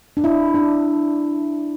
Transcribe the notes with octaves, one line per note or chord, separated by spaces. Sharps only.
D4
E4
D4